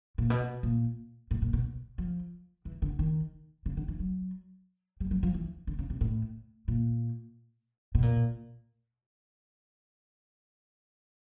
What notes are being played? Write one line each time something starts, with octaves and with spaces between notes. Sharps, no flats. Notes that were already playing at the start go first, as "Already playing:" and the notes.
A#2
B2
A#2
A2
A#2
B2
F3
E3
D3
D#3
C#3
D3
E3
F#3
G3
F#3
F3
E3
D3
C#3
C3
A2
A#2
B2
A#2